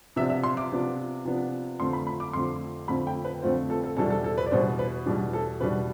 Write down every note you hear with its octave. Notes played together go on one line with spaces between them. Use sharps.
C3 F3 B3 D4 F4 E5
E5
C6
D6
C3 F3 B3 D4 F4
C3 F3 B3 D4 F4
F2 D3 A3 C4 F4 C6
B5
B5
D6
F2 D3 A3 C4 F4 C6
F2 D3 A3 C4 F4 B5
G5
B4
F2 D3 A3 C4 F4 C5
A4
A4
E2 B2 G3 D4 A4
A4
A4
B4
D5
E2 B2 G3 D4 C5
B4
E2 B2 G3 D4
A4
E2 B2 G3 D4 B4